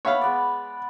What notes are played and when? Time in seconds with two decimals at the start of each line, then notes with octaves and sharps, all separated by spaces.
0.05 B3 C#5 E5 F5 B5
0.21 G#3 B3 D5